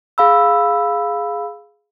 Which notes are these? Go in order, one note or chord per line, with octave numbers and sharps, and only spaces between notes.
G#4 F5 B5 E6